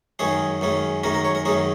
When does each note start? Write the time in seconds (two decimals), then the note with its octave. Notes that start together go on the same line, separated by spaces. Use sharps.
0.19 F#2 D#3 G#3 C#4 G#4
0.61 F#2 D#3 G#3 C#4
1.04 F#2 D#3 G#3 C#4 A#4
1.14 A#4
1.25 C#5
1.35 A#4
1.45 F#2 D#3 G#3 C#4 G#4